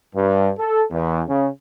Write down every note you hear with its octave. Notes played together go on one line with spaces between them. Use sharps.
G2
A4
E2
C#3